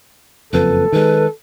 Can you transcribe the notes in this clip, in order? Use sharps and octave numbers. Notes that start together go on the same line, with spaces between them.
F#1 F2 A4 B4
D#3 G#3 B4